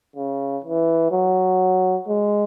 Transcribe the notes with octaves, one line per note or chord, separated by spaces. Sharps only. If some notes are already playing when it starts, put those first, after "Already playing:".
C#3
E3
F#3
G#3